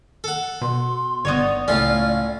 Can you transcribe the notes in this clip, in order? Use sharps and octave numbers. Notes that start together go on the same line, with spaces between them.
A4 F#5
B2 C6
G1 B3 D#4 C#5 D5
C#2 A2 C#4 F4 F5